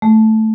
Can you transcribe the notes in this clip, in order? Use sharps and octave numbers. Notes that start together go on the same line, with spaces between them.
A3